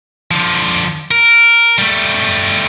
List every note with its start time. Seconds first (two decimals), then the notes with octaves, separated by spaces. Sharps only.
0.31 D3 F3
1.11 A#4
1.78 G3 A3